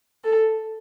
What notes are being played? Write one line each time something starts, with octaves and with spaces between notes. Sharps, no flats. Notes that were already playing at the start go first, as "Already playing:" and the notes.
A4